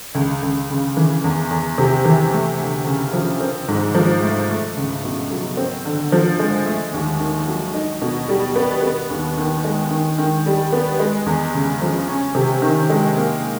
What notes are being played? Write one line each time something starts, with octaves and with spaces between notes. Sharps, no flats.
C#2
C#2
C#3
E3
E2
E2
C3
E3
A3
D2
C#3
F3
C4
G#2
F3
A3
A3
C#2
B2
F#3
C4
D3
F3
G#3
A3
D#2
D#3
F#3
D#4
B2
G3
B3
B3
D#2
D#3
G#3
D#3
D#3
G3
B3
G#3
E2
C#3
F3
C#4
C3
D#3
G#3
A#3